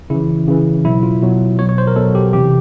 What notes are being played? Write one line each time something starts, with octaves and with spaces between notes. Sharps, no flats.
C#3 E3 E4
C#3 E3
B2 F#3 E4
F4
B2 F#3
B2 F#3 C#5
C#5
C5
A#4
B2 F#3 A4
G4
C3 E3 G4